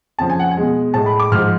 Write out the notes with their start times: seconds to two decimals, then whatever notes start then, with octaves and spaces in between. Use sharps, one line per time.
0.19 F2 C#3 F3 A5
0.30 G#5
0.39 F#5
0.51 G#5
0.57 B2 G#3
0.94 A2 G#3 A5
1.06 B5
1.19 D6
1.31 G#2 F3 G#3 F6